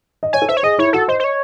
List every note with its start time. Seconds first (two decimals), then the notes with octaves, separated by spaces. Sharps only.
0.23 D#5
0.33 C#5 G#5
0.42 A4
0.49 C5 E5
0.57 C#5
0.63 G#4 D#5
0.78 E4 C#5
0.93 F#4 A4
1.08 C5 D#5
1.20 C5
1.24 C#5